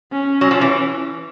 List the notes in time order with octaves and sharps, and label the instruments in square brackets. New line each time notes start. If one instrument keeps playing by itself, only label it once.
[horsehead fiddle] C#4
[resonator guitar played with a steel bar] F#3
F3
E3